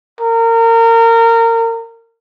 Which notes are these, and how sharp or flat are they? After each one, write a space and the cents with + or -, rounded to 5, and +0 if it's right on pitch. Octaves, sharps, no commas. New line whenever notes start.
A#4 -25